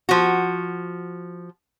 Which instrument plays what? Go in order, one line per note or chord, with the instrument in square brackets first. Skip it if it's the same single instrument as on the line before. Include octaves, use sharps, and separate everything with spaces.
[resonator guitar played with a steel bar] F3 F#4